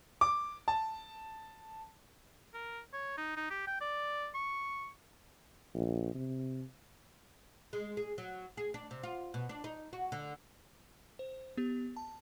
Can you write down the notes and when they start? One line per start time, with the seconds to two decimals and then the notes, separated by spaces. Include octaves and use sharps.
0.21 D6
0.68 A5
2.54 A#4
2.93 C#5
3.17 D#4
3.36 D#4
3.50 G4
3.67 G5
3.81 D5
4.35 C#6
5.75 A#1
6.15 C3
7.73 G#3
7.97 G#4
8.18 F#3
8.57 G#4
8.74 D4
8.91 C3
9.03 F4
9.34 B2
9.49 D4
9.64 D#4
9.93 F#4
10.12 D3
11.19 C5
11.57 B3 G4
11.97 A5